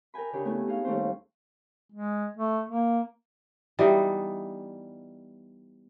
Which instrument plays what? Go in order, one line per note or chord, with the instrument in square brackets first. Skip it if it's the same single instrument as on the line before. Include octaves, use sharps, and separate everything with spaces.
[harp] A#4 D#5 G5 G#5 B5
C#3 D4 G4 A#4 C#5
A3 B3 C#4 E4 G#5
D#4 G#4 F5
D#2 G3 A3 C#4 C5
[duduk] G#3
A3
A#3
[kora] E3 G3 B3 D#4